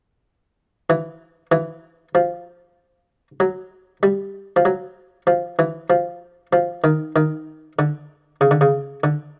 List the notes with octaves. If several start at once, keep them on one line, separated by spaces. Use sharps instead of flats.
E3
E3
F3
F#3
G3
F3
F#3
F3
E3
F3
F3
D#3
D#3
D3
C#3
D3
C#3
D3